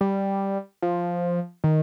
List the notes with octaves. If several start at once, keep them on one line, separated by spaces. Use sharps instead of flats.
G3
F3
D#3